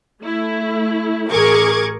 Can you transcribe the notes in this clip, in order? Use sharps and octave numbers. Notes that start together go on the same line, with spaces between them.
A3 E4
A1 G#4 A#4 C#6 D6 G#6